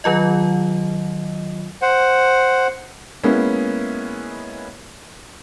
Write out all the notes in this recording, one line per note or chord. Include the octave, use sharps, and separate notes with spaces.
D#3 F#3 F4 D#5
C5 F#5
G#3 A#3 B3 C#4 E4